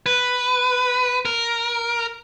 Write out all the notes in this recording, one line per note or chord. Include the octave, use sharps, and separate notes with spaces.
B4
A#4